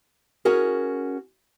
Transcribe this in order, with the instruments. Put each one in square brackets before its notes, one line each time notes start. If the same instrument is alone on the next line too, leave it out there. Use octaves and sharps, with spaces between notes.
[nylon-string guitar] C#4 F#4 G#4 A#4